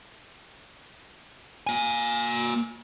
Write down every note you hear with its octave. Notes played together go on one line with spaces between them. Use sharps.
A#3 G#5